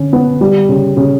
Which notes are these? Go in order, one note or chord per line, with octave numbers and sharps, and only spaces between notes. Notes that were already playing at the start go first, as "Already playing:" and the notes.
Already playing: D3 C#4
B3
G3
C#3
C#3